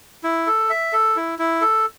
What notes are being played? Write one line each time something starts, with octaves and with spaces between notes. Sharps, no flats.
E4
A4
E5
A4
E4
E4
A4